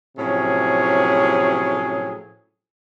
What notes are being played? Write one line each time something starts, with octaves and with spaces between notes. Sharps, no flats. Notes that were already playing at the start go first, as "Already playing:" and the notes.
A2 C3 F3 F#3 C#4 G#4